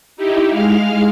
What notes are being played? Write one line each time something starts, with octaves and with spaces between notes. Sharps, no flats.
D#4 E4 G4
G#3 F5 F6